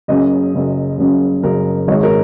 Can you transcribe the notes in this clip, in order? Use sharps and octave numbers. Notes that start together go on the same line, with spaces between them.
F#1 F#2 C#3 D#5
F#1 F#2 C#3
F#1 F#2 C#3
F#1 F#2 C#3 A#4
G#1 G#2 D#3 G#3 C#5
A#4